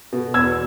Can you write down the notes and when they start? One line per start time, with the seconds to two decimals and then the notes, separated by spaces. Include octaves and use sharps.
0.12 B2
0.34 E2 E6 G#6